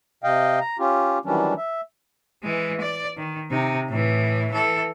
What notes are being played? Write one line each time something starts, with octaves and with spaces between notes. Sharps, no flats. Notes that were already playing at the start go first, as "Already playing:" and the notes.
C3 D#5 F5 G5
A#5
C#4 F4 G4
D#3 E3 F#3 G3 C#4 D4
E5
E3 G#3
D5
D#3
C3 D#4
A2 E3
E3 A4